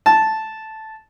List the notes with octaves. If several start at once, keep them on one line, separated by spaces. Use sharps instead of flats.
A5